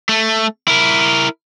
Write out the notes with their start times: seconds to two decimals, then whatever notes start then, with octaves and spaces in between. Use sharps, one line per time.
0.09 A3
0.68 E4 A#4